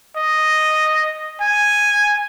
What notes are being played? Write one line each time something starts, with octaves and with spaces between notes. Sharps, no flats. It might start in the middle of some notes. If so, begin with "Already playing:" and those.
D#5
G#5